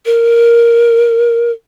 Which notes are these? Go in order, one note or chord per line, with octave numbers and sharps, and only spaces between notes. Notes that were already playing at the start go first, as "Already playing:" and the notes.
A#4